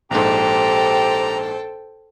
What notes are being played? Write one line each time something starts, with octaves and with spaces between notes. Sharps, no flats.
A#1 G#2 G4 A4 C5 G5 A#5